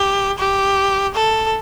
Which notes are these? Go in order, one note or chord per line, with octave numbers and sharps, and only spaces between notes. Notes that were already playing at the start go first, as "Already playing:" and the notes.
Already playing: G4
G4
A4